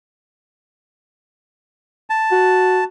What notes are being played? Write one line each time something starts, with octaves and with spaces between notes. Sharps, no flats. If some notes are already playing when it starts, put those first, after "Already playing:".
A5
F#4